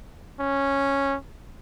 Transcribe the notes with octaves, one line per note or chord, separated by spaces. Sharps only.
C#4